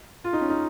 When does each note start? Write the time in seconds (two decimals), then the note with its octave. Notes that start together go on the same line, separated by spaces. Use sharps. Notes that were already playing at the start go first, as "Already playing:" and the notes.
0.24 F4
0.33 D#4
0.41 C#4
0.49 D#4